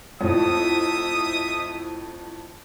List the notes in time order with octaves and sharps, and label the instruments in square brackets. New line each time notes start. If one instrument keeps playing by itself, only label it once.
[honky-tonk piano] F2 A2 [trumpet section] D#4 E5 D#6